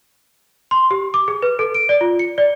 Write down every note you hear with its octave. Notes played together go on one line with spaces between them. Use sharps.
C6
G4
D6
G#4
B4
A4
D7
D5
F4
C#7
D5